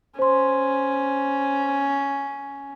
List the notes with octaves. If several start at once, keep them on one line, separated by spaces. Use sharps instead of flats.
C#4 C5 C6